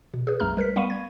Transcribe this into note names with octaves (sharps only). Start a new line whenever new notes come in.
B2
G#4 B4
B1 F#2 A3 A#5 F6
G3 A#4 B4 B6
G3 B3 F5 B5 C#6 D#7
G#6